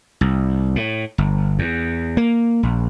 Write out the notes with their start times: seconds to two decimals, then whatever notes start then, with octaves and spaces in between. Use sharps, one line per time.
0.21 C2
0.76 A2
1.18 G1
1.59 E2
2.17 A#3
2.63 A#1